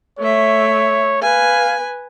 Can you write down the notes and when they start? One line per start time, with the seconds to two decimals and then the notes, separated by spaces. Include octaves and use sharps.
0.19 A3 C#5 E5
1.22 B4 F5 G#5